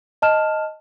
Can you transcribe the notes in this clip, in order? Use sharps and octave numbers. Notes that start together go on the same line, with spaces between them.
D#5 A5 F6 E7